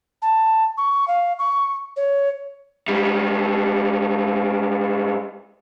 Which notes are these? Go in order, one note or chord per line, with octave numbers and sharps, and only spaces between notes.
A5
C#6
F5
C#6
C#5
G#2 G3